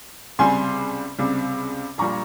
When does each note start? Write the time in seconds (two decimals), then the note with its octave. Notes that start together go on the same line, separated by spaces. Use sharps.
0.39 C#2 C3 G3 G#5 C6
1.18 C#2 C3 G3
1.98 A#1 A#2 G3 A#5 C#6